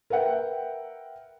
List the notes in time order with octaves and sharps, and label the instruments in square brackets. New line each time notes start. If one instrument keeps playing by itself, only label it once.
[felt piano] A#4 B4 E5 F#5 G5